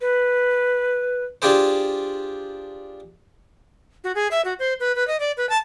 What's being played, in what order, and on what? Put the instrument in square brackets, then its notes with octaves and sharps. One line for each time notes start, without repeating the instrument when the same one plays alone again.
[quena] B4
[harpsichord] D4 F4 G4 G#4 C5
[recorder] F#4
G#4
E5
F#4
C5
B4
B4
D#5
D5
B4
A5